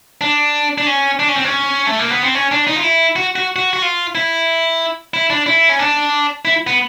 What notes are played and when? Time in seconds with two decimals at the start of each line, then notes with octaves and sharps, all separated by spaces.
0.21 D4
0.78 D4
0.87 C#4
1.19 D4
1.29 C#4
1.36 C4
1.44 C#4
1.87 A3
1.99 A#3
2.10 B3
2.23 C4
2.35 C#4
2.52 D4
2.67 D#4
2.76 F4
2.84 E4
3.16 F#4
3.36 F#4
3.56 F#4
3.73 F#4
3.82 F4
4.15 E4
5.14 E4
5.30 D4
5.46 E4
5.69 C#4
5.79 D4
6.45 E4
6.67 B3